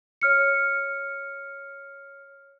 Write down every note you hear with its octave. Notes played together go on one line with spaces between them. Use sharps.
C#5 F6 C#7